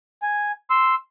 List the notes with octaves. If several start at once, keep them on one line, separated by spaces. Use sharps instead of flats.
G#5
C6 E6